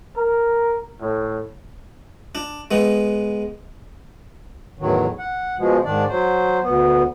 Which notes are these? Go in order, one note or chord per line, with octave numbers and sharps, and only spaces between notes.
A#4
A2
D4
G#3 B3
E2 A2 D#3 F#3
F#5
B2 F3 G#3
G#2 D#3 D4 D5
F#3 C5
D2 B3